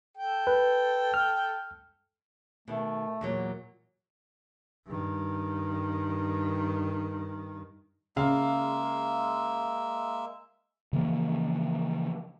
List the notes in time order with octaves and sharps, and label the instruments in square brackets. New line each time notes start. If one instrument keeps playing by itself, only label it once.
[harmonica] A4 G5
[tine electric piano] B4
F6
[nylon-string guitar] B2 D#3 [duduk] A3
[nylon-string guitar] E2 A#2 F#3
[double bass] G2 D#3
[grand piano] C#3 F5 [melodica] G#3 A#3 E5
[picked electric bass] C#3 E3 F3 A#3